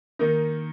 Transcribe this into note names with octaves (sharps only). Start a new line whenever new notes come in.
D#3 A#3 D#4 A#4